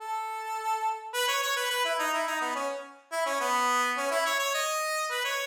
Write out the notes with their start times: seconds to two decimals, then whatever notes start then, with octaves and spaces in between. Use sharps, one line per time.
0.01 A4
1.14 B4
1.28 C#5
1.42 C#5
1.57 B4
1.71 B4
1.85 E4
1.99 D#4
2.13 E4
2.27 D#4
2.41 B3
2.55 C#4
3.12 E4
3.26 C#4
3.41 B3
3.97 C#4
4.11 E4
4.26 C#5
4.39 C#5
4.54 D#5
5.11 B4
5.25 C#5